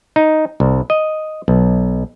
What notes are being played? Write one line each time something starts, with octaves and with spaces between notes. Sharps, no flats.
D#4
C2
D#5
B1